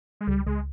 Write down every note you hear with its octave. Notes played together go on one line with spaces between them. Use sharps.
G#3
C#2 G3
C#2 G#3